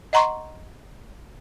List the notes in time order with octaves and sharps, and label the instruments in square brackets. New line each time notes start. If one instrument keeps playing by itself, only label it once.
[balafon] D#5 F#5 A#5 C6 C#6